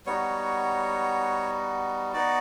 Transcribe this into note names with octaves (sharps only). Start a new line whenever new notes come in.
G3 B3 D#4 F#4 C#5
B3 D#4 F#4 D5